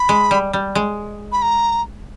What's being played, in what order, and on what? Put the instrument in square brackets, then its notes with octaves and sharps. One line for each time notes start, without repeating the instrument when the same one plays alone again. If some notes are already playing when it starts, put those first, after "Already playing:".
Already playing: [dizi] B5
[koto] G#3
G3
G3
G#3
[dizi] B5
A#5